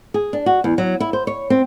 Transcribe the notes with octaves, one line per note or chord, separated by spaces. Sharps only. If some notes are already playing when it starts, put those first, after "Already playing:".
G#4
D4
F#4
E2
F#3
E4
C5
C#5
C4